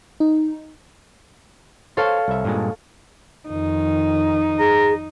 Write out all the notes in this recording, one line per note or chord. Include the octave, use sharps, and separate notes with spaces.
D#4
A4 C5 C#5 F5 A5
C2 E5
G2 A#2 G#3
F2 D#3 D#4
G#4 A#5